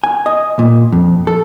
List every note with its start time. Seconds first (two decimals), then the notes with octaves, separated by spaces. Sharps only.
0.04 G#5
0.26 D#5
0.59 A#2
0.92 F2
1.27 A4